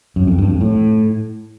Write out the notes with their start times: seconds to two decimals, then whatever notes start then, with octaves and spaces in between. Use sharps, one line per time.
0.16 F#2
0.27 F2
0.38 G2
0.50 F2
0.61 A2